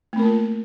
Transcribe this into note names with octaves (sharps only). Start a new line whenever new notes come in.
A3 A#3 C4 F4 A#4